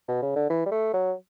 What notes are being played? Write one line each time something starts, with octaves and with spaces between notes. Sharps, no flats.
B2
C#3
D3
E3
G3
A3
F#3